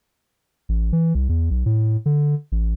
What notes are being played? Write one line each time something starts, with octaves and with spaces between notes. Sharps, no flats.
A1
E3
C2
E2
B1
A2
D3
A1